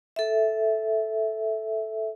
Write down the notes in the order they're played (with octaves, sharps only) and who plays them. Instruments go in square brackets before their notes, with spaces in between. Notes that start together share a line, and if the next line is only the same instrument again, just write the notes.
[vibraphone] A4 E5